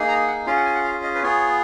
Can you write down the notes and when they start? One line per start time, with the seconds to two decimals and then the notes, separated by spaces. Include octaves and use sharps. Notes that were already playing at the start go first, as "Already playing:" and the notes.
Already playing: A#3 D#4 G#4
0.08 A#5
0.27 F#5
0.46 C#4 F4 G#4 F5
0.56 F#5
0.65 G#5
0.75 F#5
0.84 F5
1.03 D#5
1.15 B4
1.23 B3 F4 G#4 C#5